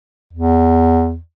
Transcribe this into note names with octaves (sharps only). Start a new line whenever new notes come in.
E2